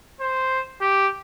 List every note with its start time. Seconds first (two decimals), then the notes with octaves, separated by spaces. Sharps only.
0.21 C5
0.81 G4